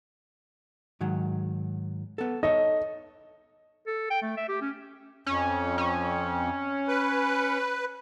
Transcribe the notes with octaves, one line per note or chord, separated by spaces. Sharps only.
G#2 D#3 F#3
B3 A4
D#4 A4 C#5 D#5
A4
G5
A3
E5
G4
C#4
F2 C#4
C#4
B4